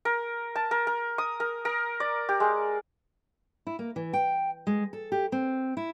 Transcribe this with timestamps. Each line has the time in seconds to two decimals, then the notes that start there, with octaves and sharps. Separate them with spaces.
0.05 A#4
0.56 A5
0.71 A#4
0.87 A#4
1.18 D#6
1.40 A#4
1.65 A#4
2.00 D5
2.29 G4
2.40 G#3
3.67 E4
3.79 A#3
3.96 E3
4.13 G5
4.67 G#3
4.93 A4
5.12 G4
5.32 C4
5.77 E4